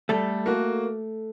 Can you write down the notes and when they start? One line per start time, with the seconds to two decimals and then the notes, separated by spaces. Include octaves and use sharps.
0.09 G3 A3 A4
0.46 A#3 F#4